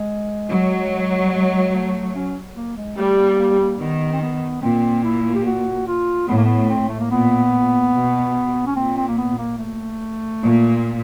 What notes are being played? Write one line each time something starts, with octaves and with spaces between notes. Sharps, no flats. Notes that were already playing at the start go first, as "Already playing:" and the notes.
Already playing: G#3
F#3
G3
G#3
A3
C#4
A#3
G#3
G3 A3
A#3
A#3
A#3
D#3 B3
C4
B3
A#2 C4
E4
G4
F#4
F4
A2 B3
A#3
B3
C4
A3
A#3
A#2 B3
B2
C#4
A#2 C4
C4
A#3
B3
A#3
A3
A#2